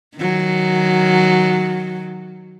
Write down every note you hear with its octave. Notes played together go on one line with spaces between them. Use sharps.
D#3 F#3